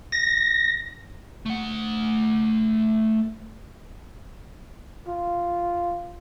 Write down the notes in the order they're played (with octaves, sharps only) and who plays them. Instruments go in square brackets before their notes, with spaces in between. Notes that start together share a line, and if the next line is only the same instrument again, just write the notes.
[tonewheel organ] A#6
[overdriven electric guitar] A3 F#5
[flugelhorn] F4